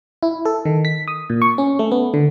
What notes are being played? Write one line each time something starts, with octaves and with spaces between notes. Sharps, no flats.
E4
A4
D#3
B6
D#6
A#2
C#6
C#4
A3
B3
D3